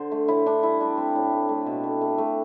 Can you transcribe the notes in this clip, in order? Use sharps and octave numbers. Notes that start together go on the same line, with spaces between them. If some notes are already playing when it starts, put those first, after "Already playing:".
Already playing: D3 C5
A3
A2 E4
A2 D4
G3 E4
G3 D4
A3 C4
A2
A3
A3
B2
A3
A3
A3